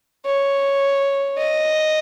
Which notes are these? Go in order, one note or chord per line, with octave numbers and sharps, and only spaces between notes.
C#5
D#5